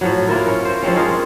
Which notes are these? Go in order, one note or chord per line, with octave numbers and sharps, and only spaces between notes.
A2 F3 F#3
A#3 E4 F4 A#4
C#4 A#4
C5
F3 G#3 C4 C#4
G#3 D#4 F4 A#4